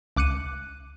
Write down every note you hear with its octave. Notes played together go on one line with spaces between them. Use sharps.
C#2 D6 F#6 C#7 D#7